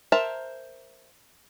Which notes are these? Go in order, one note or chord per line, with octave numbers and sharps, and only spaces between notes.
A#4 C5 E5 A5 A#5